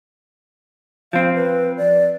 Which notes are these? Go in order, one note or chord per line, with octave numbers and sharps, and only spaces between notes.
F3 C4 F5
B4
D5